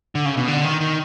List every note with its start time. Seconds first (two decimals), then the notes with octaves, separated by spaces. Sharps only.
0.15 D3
0.25 C#3
0.37 B2
0.48 D3
0.64 D#3
0.80 D#3